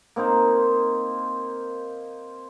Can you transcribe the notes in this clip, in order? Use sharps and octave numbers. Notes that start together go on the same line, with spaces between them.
A#3 C4 D#4 C5